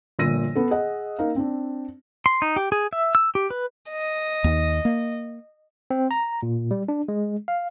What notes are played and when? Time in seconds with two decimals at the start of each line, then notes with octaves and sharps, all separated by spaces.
0.19 G1 A#2 F3 E6 A#6 D#7
0.56 B3 A4
0.71 G#4 D#5 F#5
1.19 A#3 D#4 F5
1.36 C4 D4
2.26 C6
2.42 D#4
2.56 G4
2.72 G#4
2.93 E5
3.15 E6
3.35 G4
3.50 B4
3.91 D#5
4.44 D#2
4.85 A#3
5.91 C4
6.11 A#5
6.43 A#2
6.71 G3
6.88 D4
7.08 G#3
7.48 F5